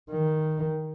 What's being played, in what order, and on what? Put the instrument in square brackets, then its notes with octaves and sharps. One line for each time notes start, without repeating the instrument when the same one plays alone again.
[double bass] D#3